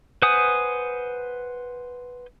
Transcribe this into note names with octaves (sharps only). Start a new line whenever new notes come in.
B4 C5 F#5 G#5 D#6